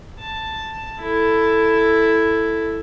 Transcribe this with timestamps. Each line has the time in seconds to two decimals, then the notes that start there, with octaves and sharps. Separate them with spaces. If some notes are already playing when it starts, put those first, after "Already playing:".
0.19 A5
1.00 E4 A4